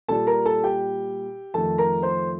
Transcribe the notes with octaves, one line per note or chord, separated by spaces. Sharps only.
A#2 G3 A4 A5
A#4 A#5
A4 A5
G4 G5
F2 D#3 A3 A4 A5
A#4 A#5
C5 C6